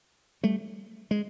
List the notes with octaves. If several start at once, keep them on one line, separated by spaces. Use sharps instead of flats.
G3 A3
G#3